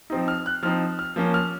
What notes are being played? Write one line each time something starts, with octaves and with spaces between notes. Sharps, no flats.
F3 C4 D#4
F6
F#6
F3 C4 D#4 F6
F6
F3 A#3 C#4
F6